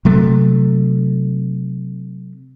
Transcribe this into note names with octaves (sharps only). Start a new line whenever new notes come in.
C3 F#3 A3